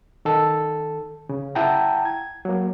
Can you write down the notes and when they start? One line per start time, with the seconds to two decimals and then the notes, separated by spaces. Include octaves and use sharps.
0.25 D#3 A4
1.29 C#3
1.55 E4 F#5 G5 A5 A#5
2.05 G#6
2.45 F#3 A#3